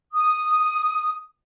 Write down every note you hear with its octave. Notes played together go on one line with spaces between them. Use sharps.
D#6